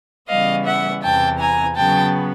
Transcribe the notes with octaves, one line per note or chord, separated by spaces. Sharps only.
C#3 E3 G3 B3 D#5 F5
E5 F#5
E2 C3 E3 G5 A5
G#5 A#5
C#3 F#3 B3 G5 A5